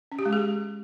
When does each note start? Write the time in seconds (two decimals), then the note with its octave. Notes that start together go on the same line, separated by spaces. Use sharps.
0.12 C#4
0.19 G4
0.26 G#3
0.33 G#4